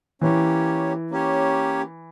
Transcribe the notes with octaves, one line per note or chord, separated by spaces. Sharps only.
E3 A#3 C#4 G4 C#5
A#3 C#4 G4 C#5